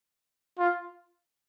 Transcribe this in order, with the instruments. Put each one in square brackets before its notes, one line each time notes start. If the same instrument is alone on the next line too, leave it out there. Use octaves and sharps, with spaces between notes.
[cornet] F4